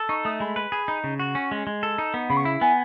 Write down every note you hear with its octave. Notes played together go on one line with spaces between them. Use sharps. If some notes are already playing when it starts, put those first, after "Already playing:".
Already playing: A4
D#4 C#6
A3 D#6
G#3 B5
B4
G#4
D#4
C#3
F#4
C#4
G#3
G#3
A4
D#4
B3
C#3 B5
C#6
E4 B5
B3 G#5